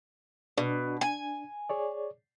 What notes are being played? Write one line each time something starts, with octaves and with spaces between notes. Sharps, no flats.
B2 D4
G#5
G#4 C#5 D5